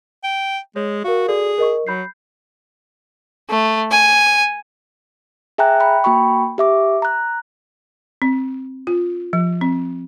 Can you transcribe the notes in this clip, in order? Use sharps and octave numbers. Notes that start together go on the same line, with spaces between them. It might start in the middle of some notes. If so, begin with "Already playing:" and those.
G5
G#3 C#5
F#4 A#4 F5
F#4 G#4 A4 D5
A#4 D#5 C#6
F#3 B5 G6 C7
A3
G#5
G#4 E5 G5 G#5 A#5 F#6
G5 B5
A#3 F#4 G5 B5 C#6
G4 E5 D6
A#5 F#6
C4
F4
F3
C4